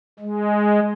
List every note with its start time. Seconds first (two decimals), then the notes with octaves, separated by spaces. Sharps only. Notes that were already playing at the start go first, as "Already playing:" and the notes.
0.19 G#3